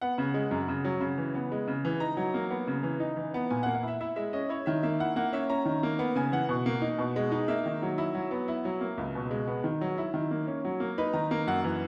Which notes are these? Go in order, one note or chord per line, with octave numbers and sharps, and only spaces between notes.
B3 F#5
C#3
G#3
F#2
C#3
F#3
C#3
E3
B3
G#3
C#3
E3
D#4 A#5
F#3
A#3
B3
C#3
E3
D#4
E3
B3
A#2 G#5
F#5
A#3
F#5
E4 E5
E4 E5
G#3 E5
C#4 D#5
E4 C#5
D#3 E5
A#3 E5
E4 F#5
A#3 F#5
C#4 E5
C#4 A#5
D#3
A#3
B3
C#3 G#5
E3 F#5
B2
A#3
D#4
B2
G#3
D#4
A#3 E5
D#3
F#3
E4
F#3
B3
E4
F#3
A#3
C#2
B2
G#3
B3
D#3
F#3
E4
D#3
A#3
C#4
F#3
A#3
D#4 B4
D#3 A#5
A#3 A#5
F#2 F#5
E3